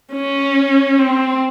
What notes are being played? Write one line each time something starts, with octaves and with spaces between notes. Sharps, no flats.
C#4
C4